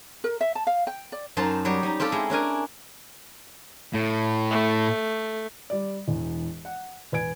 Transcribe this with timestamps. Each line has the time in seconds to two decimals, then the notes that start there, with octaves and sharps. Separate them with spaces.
0.24 A#4
0.41 E5
0.55 A5
0.67 F5
0.87 G5
1.12 D5
1.37 F#2 D#4 C5 A5
1.65 F#3 G3 G4
1.83 G3 D#4
2.00 C4 F4 G4 A4
2.12 G#3 E4
2.30 C#4 D4 A#4 G#5
3.94 A2
4.51 A3
5.70 G3 D5
6.08 E1 E2
6.65 F#5
7.12 E1 B4 G#5 G#6 D7